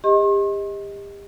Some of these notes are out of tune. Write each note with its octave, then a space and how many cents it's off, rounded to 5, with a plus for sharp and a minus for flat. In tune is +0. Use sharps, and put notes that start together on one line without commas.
G4 +35 D#5 +15 C6 +45